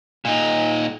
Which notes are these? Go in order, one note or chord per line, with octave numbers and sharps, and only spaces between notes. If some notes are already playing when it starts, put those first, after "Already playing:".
A#2 D#4